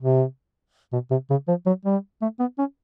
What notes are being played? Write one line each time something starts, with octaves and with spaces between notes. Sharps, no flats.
C3
B2
C3
C#3
F3
F#3
G3
A3
B3
C#4